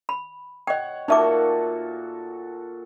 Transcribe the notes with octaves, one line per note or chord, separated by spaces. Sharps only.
B5
C#5 D#5 F#5 G5
A#2 D#4 F#4 A4 E5 D6